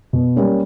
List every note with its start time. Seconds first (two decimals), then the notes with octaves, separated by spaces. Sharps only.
0.13 B2
0.36 G3 A#3 C#4